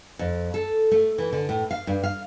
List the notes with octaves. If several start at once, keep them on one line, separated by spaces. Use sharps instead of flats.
F2
A4
A3
E3
D3
A2
F5
G2
F5